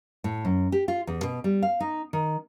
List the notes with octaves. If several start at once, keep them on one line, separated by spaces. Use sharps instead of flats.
A2
F#2
G4
F4
E2
B2
G3
F5
D#4
D#3